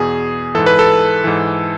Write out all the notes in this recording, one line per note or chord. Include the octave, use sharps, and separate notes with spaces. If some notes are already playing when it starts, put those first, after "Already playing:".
Already playing: E2 B2 G#4
G#2 E3 A4
B4
A4
G#2 E3